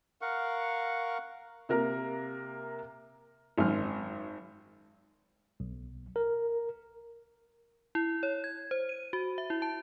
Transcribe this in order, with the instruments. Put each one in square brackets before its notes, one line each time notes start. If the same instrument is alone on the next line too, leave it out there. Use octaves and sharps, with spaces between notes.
[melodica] A#4 F5 F#5 C#6
[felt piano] C3 A#3 A#4
[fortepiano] G#1 F#2 F6
[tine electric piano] B1
A#4
[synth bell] E4
C#5
G#6
C5
D#7
F#4
E5
E4
A5